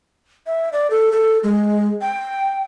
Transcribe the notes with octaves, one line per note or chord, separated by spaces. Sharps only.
E5
D5
A4
A4
G#3
G5